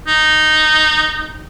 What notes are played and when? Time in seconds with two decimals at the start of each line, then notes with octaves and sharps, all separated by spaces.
0.08 D#4